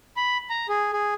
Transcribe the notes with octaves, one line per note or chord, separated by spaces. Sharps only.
B5
A#5
G#4
G#4